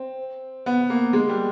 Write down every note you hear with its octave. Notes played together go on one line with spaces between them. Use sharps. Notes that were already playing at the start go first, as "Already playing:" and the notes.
Already playing: C4
B3
A#3
G#3
G3